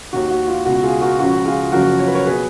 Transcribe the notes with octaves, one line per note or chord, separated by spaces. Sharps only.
D#2 D#3 F#4
F#4
F4
C#2 B2 F#4
F4 G#4
F#4 A#4
C#2 C#3 F3 F#4
F4 G#4
F#1 F#2 C#3 F3 F#4 A#4
C#5
B4
A#4 C#5
B2 G#4 B4